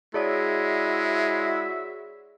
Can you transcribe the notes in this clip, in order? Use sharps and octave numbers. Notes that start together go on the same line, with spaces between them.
G#3 E4 F#4 G#4 C#5 D5 E5